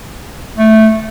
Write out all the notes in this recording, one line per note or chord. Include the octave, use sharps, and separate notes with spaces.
A3